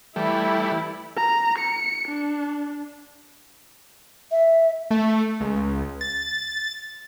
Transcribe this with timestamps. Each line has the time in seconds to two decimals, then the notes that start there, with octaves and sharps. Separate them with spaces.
0.16 E3 G3 A3 E4
1.17 A#5
1.58 C#7
2.08 D4
4.31 E5
4.91 A3
5.40 C#2
6.01 A6